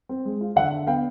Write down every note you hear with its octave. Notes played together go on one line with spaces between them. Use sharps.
C4
G#3
F4
D3 E5 F#5
D4
B3 F5 G5